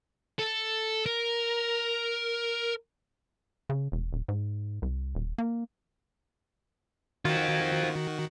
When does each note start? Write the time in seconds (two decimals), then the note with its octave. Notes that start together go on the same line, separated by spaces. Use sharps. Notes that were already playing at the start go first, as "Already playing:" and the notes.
0.39 A4
1.06 A#4
3.69 C#3
3.92 E1
4.13 D#1
4.28 G#2
4.82 C2
5.15 D#1
5.38 A#3
7.25 D#3 C4 F4 F#4